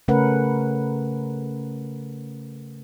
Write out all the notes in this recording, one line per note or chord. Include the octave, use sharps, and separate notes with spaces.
C#3 A3 C#4 A#4 B4 F#5